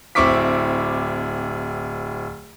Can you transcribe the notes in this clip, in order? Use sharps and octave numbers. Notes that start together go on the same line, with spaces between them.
D1 C4 E4 C#6 D6 B6